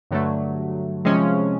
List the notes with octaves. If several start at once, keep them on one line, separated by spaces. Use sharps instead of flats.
G2 D3 F#3 A3
C3 F3 G#3 C#4